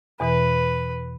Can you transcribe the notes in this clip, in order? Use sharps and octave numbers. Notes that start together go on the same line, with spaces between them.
E2 B2 E3 B4